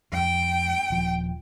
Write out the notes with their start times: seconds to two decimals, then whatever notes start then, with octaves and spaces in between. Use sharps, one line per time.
0.12 F2 G5
0.90 D#1 F3